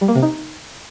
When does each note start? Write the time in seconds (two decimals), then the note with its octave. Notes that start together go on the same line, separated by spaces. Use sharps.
0.01 G3
0.08 A#3
0.15 C3
0.22 D#4